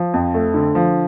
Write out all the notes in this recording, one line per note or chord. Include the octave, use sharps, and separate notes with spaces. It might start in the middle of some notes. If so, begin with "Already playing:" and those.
Already playing: F3
F2
A3
D3
F3